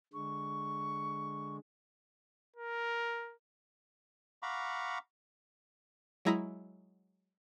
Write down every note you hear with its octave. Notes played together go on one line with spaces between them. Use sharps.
D3 G#3 C#6
A#4
F5 F#5 A#5 B5 C#6 D6
F#3 G#3 E4 A#5 D#6 B6